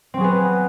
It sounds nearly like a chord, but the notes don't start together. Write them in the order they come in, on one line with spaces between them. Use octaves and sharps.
C4 F#3 G#4 B3